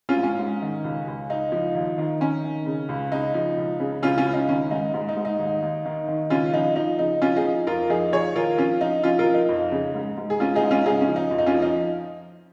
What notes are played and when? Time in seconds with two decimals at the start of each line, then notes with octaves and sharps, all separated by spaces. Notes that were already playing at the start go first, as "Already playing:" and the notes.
0.09 C#4 F4
0.16 G#2
0.23 C#4
0.39 G#2
0.62 D#3
0.84 C#2
1.07 C#2
1.29 C#2 D#4
1.52 F3
1.75 D#2
1.98 D#3
2.21 D#3 C#4
2.44 D#3
2.66 C#3
2.89 C#2
3.12 C#3 D#4
3.34 F3
3.58 C#2
3.80 C#3
4.03 C#2 C#4 F4
4.18 C#4 F4
4.25 C#2
4.33 D#4
4.49 D#3 C#4
4.71 G#2 D#4
4.94 G#2
5.09 D#4
5.17 G#2
5.25 D#4
5.39 D#2
5.62 D#2
5.85 D#3
6.08 D#3
6.30 C#2 C#4 F4
6.53 F3 D#4
6.76 F3 D#4
6.99 C#3 D#4
7.22 F3 C#4 F4
7.37 D#4 G#4
7.44 F3
7.67 F2 F4 A#4
7.90 F3 D#4 G#4
8.13 F3 G#4 C#5
8.35 D#2 F4 A#4
8.58 F3 C#4 F4
8.81 F3 D#4
9.03 F3 C#4 F4
9.19 F4 A#4
9.26 F3
9.34 D#4
9.49 F2
9.72 C#3
9.95 G#2
10.18 G#2
10.30 G#4
10.40 G#2 C#4 F4
10.55 D#4 G#4
10.63 G#2
10.71 C#4 F4
10.86 C#3 D#4 G#4
11.01 C#4
11.08 F3
11.16 D#4
11.31 F2
11.38 D#4
11.46 C#4 F4
11.54 F3
11.62 D#4